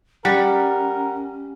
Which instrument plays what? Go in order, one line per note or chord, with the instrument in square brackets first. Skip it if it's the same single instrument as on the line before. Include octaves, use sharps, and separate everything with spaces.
[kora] G3 [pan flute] C#4 [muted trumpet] A#4 [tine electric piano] F#5